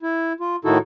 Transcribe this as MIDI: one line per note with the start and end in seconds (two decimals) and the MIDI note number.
0.03 0.33 64
0.40 0.56 65
0.65 0.78 45
0.65 0.78 51
0.65 0.78 63
0.65 0.78 64
0.65 0.78 66
0.65 0.78 69